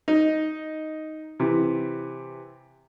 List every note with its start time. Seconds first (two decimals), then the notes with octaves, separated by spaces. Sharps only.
0.08 D#4
1.40 C3 E3